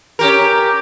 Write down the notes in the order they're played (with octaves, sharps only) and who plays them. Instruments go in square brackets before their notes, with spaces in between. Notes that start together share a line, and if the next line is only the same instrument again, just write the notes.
[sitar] C#4 G4 A#4